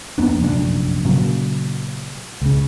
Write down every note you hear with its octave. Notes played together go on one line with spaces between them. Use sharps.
F2 A#3 B3 D4
F1 A#1 F#2 D4
A#2 C#3 F#3
C#2 C#3